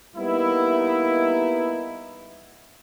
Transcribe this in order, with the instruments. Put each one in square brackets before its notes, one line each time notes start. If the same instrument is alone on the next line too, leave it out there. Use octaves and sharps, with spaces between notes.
[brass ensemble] G3 A#3 B3 D#4 E4